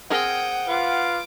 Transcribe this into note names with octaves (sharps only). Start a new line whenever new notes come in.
C4 G#4 A#4 F#5 G5 D#6
F4 B4 F5 D6